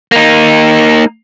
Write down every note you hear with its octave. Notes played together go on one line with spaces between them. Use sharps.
A#3 D#4